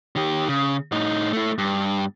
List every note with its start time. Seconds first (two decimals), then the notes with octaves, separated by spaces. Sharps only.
0.16 D#3 G4
0.49 C#3
0.92 A2 D#4
1.33 A3 E4
1.58 G2